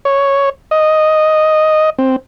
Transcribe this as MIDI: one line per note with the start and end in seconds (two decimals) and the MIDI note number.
0.05 0.50 73
0.71 1.90 75
1.98 2.16 60